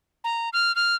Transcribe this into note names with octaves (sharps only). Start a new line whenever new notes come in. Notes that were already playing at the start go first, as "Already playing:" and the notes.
A#5
F6
F6